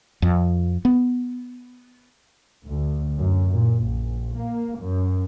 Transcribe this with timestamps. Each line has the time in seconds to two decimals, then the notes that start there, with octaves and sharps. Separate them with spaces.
0.22 F2
0.85 B3
2.66 D2
3.17 F#2
3.50 A#2
3.84 A#1
4.37 A#3
4.79 F#2